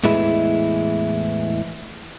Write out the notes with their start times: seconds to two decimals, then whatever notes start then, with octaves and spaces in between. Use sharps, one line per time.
0.04 E2 A2 E3 G#3 E4